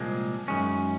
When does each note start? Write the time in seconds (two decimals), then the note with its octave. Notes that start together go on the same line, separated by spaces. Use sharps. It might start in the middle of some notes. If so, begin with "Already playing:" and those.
Already playing: C2 A#2 F3 G#3 C4
0.48 F#2 D#3 G#3 C#4